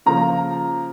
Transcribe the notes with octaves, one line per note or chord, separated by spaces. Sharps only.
C#3 F3 A#3 A#5